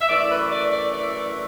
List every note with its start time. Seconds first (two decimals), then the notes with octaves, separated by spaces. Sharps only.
0.01 E5
0.08 F#2 E3 A3 D5
0.30 B4
0.51 D5
0.71 D5
0.92 D5